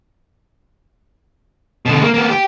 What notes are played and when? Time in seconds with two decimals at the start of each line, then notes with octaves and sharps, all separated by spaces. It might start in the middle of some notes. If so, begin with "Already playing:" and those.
1.85 B2 D3
2.01 G#3 A#3
2.14 A#3 B3
2.29 G4